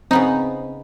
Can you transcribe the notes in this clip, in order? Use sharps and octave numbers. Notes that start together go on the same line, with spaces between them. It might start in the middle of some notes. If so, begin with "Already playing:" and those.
C#3 B3 C4 D#4